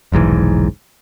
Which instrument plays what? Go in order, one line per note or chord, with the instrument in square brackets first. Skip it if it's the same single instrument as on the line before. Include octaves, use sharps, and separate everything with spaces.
[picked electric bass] F1 B1 G#2 E3